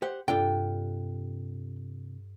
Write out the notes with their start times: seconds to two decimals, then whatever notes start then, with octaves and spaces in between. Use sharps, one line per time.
0.02 G4 C5 F#5
0.28 G2 C3 D4 F4 A4 G5